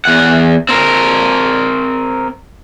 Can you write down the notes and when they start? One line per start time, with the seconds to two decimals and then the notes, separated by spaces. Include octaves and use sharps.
0.05 E2 F#5
0.69 C4 A#4